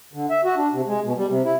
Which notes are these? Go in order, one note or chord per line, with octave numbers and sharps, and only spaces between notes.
D3
E5
F#4
D4
C3
G#3
B2
G3
C3
E4